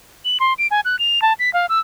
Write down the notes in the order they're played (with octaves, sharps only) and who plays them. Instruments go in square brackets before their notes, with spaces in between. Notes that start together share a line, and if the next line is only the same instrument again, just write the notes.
[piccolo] F#7
C6
D7
G#5
F#6
F7
A5
B6
F5
E6